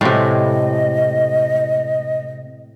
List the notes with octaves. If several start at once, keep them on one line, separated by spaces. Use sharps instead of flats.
A2 C3 G#3 D#5